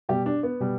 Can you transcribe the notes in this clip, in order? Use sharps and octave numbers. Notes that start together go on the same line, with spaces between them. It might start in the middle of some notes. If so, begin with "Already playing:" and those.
B2 G3 G4
D4
B3
B2 G3